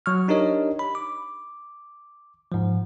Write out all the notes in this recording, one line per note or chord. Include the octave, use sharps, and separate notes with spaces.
F#3 C#6 F6
D4 D#4 G4 A#4 C#5 D#5
B5
D6
G#2 F3